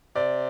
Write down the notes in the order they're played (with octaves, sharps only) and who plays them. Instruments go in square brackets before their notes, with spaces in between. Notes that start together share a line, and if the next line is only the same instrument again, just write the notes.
[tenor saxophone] C3 [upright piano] D5